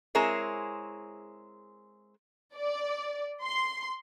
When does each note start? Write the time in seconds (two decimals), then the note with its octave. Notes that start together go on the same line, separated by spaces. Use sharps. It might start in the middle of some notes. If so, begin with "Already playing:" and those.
0.15 G#3 C4 E4 G#4 A#4 C#5
2.55 D5
3.43 C6